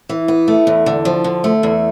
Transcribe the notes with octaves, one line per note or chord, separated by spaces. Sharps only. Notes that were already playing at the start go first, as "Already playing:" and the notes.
E3
B3
A3
E2
D3
F3
D3
A3
E2